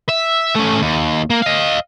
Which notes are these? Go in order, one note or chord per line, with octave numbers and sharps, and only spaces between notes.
E5
A3 C#4
D#2
A#3
D#5 F5